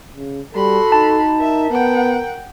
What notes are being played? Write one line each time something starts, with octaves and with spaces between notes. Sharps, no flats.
C#3
G3 F#4 A4 B5 C6
D#4 A5
A#4 E5
B3 F#5 G5